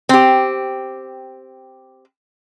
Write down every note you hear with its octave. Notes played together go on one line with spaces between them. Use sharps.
C4 G4